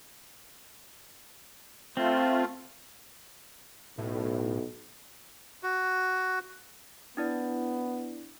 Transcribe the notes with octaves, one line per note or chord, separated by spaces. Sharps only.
A3 C4 F4
B1 A2
F#4
B3 D4 E4 D5